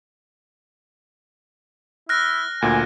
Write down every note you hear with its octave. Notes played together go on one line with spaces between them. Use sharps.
E4 F6 F#6 A#6
D2 A#2 G#5